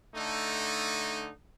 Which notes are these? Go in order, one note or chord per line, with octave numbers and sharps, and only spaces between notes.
D3 A3 D#4